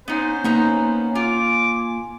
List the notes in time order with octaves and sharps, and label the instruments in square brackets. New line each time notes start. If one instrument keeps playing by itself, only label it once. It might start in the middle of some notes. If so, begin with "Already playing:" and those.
[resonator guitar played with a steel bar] B3 D#4 [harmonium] C#4 [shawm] C5
[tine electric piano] A#3 [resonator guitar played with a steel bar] B3 D#4 A#5
[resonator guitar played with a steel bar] F4 [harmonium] G#5 [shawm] D6